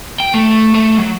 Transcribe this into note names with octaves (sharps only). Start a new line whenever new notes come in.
G5
A3
A3
F#3